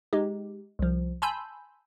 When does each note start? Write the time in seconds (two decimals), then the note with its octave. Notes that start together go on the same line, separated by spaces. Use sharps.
0.13 G#3 D#4 G4
0.79 C2 F3
1.22 G#5 A5 B5 C6 E6 G6